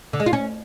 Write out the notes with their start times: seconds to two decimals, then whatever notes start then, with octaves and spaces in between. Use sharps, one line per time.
0.13 D3
0.20 G#3
0.26 F4
0.33 C#4